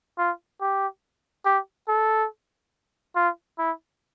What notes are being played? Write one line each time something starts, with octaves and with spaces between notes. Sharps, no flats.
F4
G4
G4
A4
F4
E4